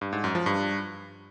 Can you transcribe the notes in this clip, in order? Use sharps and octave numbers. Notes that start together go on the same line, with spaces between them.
G2
G#2
F#2
F3
G2